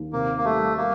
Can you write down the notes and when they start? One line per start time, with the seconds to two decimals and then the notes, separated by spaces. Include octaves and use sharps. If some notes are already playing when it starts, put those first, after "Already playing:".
Already playing: D#2
0.12 C3 A#3
0.38 A#3
0.44 G3 A3
0.77 G3 A#3